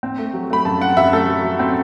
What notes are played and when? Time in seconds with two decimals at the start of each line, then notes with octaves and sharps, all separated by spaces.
0.03 C4
0.18 A3
0.34 F#3
0.50 A3 B5
0.65 F#2 A5
0.81 C4 F#5
0.97 F#2 E5
1.12 A3 A4
1.29 F#3
1.44 F#3
1.59 C4